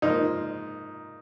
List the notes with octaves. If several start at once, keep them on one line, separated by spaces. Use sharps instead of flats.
G#2 F3 A#3 D#4